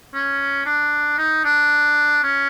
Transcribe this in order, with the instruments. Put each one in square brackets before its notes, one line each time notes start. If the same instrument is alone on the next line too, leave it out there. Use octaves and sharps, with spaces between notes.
[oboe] C#4
D4
D#4
D4
C#4